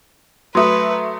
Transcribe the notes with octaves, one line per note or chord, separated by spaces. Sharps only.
F#3 A3 B4 C6 D#6